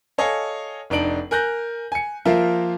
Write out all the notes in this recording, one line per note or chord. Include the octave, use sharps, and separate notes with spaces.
A4 C#5 D#5 F5 G#5
F1 D4 D#4 D7 F#7
A#4 G#5 F#6 G6 A#6
G#5 C#7
F3 A#3 F4 A#4 E5